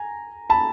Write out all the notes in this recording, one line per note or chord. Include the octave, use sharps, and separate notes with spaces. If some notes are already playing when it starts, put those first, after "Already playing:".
Already playing: G#5 A#5
A5 B5